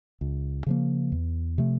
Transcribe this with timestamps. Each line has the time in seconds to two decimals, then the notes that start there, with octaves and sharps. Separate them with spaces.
0.21 C#2
0.66 C#3 F3 A#3
1.12 E2
1.58 C3 F3 A3